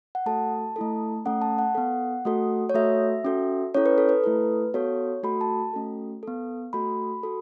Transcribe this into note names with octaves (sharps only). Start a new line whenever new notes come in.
F#5
A3 F#4 A4 A5
A3 E4 A4
A3 C#4 A4 F#5
A5
F#5
B3 A4
A3 F#4 A4
C#5
A3 F#4 A4 E5
C#4 F#4 A4
C#4 E4 A4 C#5
B4
A4
B4
A3 E4 A4
B3 F#4 A4 C#5
A3 F#4 A4 B5
A5
A3 C#4 F#4 A4
B3 A4
A3 F#4 A4 B5
F#4 A4